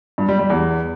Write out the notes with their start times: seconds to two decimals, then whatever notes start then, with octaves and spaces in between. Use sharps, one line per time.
0.18 G2
0.29 G3
0.39 G3
0.50 E2